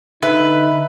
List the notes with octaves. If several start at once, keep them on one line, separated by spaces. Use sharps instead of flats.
D3 D#4 B4 E5